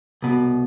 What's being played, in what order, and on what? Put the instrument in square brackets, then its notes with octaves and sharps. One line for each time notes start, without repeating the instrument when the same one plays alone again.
[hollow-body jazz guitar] C2 B2